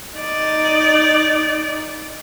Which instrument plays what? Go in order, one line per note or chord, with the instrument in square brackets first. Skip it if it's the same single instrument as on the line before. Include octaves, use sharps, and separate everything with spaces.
[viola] D#4 D5